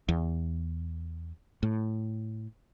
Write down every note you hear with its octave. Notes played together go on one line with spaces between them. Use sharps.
E2
A2